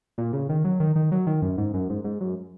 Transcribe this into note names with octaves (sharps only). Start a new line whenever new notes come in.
A#2
C#3
D#3
F#3
D#3
D#3
F#3
D#3
F#2
G#2
F#2
G#2
G#2
F#2